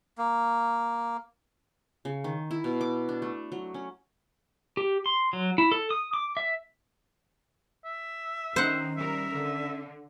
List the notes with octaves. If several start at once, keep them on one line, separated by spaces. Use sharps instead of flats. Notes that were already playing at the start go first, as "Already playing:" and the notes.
A#3
C#3
D#3
E4
B2
D6
D4
A3
F#3
C#4
G4
C6
F#3
E4
A4
D#6
D6
E5
E5
D#3 C#4 C5 F#5
G3 A#4 E5
D3